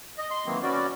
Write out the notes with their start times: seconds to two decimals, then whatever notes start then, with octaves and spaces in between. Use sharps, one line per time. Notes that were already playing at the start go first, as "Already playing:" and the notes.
0.18 D#5
0.31 C6
0.46 D#3 E3 F#3 A#3 C4
0.63 B3 C#4 F#4 D5